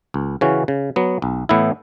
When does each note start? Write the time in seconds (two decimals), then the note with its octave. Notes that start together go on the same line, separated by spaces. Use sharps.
0.14 C#2
0.41 C#3 E3 C#4 F#4
0.68 C#3
0.96 F#3 B3
1.22 B1
1.49 A2 E3 B3 E4